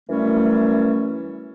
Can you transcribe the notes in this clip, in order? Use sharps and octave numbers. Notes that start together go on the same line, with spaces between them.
F#2 E3 G3 A3 C#4